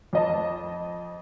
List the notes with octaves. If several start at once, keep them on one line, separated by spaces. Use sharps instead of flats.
F2 D#5 A5